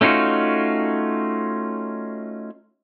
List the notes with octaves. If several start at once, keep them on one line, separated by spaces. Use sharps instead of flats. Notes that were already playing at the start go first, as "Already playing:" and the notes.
A3 C#4 D#4 F4 F#4